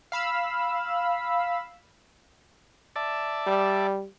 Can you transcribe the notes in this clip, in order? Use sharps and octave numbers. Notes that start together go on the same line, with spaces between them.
F5 B5 E6
D5 E5 A5
G3